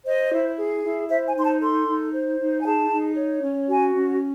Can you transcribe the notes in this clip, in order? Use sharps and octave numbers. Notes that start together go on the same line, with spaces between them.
C5 D#5
E4
G#4
E4
C5 E5
G#5
D#4 C6
A5
A4 C6
D#4
C5
D#4
G#5
G#4 A5
D#4
C#5
C#4
F#4 G#5
C#4